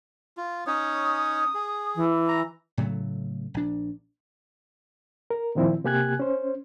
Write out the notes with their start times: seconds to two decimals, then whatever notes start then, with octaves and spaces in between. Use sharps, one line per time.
0.37 F4
0.67 C#4 D#4 C#5 D#6
1.55 G#4
1.96 E3
2.28 A#5
2.78 A2 C#3 F#3 A3
3.54 A#1 D4
5.30 A#4
5.55 A#2 D#3 F3 C4 E4
5.84 C3 A#3 G4 G#5 F#6 G#6
6.20 C#4 C5